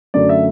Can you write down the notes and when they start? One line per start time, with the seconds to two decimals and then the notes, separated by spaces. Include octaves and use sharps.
0.14 F#2 D3 A3 D5
0.29 E5